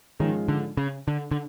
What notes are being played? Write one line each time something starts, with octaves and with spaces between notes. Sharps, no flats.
G#2 D#3 F3 G#3 C#4 F4
D3
C#3
D3
D3